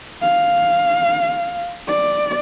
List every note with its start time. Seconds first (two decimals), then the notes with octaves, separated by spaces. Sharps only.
0.22 F5
1.88 D5